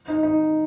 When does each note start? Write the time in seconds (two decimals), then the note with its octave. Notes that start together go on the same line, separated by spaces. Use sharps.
0.08 D#4
0.23 D#4